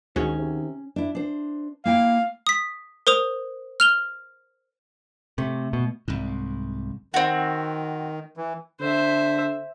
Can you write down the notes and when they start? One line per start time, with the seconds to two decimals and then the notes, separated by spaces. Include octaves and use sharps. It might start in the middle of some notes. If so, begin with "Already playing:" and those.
0.16 D2 G#2 D#3 C#4 F#4 G#4
0.39 C3
0.96 D4 E4
1.15 D4 C5
1.85 A#3 E4 F5 G5
2.47 D#6 B6
3.07 A#4 C5 D#6 F7
3.80 F6 F7 G7
5.38 C3 A3
5.73 B2
6.08 C2 G#2
7.14 D#3 C4 F#4
8.37 E3
8.80 D3 C5 E5